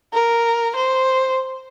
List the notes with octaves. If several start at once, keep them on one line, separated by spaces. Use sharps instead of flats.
A#4
C5